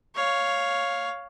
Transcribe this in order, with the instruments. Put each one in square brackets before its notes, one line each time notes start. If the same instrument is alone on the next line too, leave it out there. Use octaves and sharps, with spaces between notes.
[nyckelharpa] C#5 F5